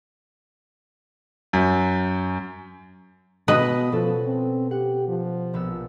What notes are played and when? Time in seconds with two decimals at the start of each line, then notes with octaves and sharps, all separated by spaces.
1.53 F#2
3.48 B2 G3 B4 D#5 E5 D#6
3.92 B2 F3 C#4 A4
4.26 C4
4.71 G4 F#5
5.08 F3
5.54 A#1 B3 E6